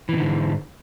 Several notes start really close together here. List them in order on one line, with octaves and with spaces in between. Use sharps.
E3 B2 D3 G#2